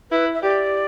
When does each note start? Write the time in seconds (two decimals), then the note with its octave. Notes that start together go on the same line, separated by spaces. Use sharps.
0.11 E4 B4
0.34 E5
0.42 G4 D5